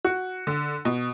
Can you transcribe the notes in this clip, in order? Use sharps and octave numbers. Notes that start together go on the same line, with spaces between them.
F#4
D3
B2